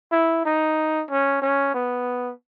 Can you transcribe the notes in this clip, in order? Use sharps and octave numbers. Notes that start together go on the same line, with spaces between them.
E4
D#4
C#4
C#4
B3